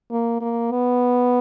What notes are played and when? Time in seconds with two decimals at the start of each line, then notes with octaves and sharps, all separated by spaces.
0.11 A#3
0.41 A#3
0.71 B3